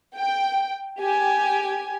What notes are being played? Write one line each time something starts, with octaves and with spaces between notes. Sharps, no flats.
G5
G4 G#5